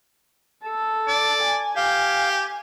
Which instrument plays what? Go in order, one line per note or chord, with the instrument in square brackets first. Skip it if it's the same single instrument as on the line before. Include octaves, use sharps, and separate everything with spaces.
[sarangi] A4
[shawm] D5
[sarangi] G#5
[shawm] G4 [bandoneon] F5